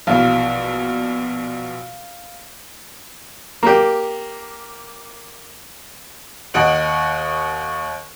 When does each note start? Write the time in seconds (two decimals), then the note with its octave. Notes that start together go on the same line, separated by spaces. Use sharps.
0.07 A#1 B2 E3 F5
3.63 A#3 G4
6.54 D#2 D#5 F#5 D7 F#7